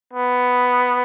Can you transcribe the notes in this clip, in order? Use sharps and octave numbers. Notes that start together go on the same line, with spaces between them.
B3